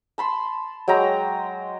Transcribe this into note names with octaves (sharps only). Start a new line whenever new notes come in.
A5 B5 C6
F#3 G#3 G5 A#5